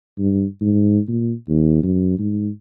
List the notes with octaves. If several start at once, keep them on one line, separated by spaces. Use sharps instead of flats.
G2
G#2
A#2
D#2
F#2
G#2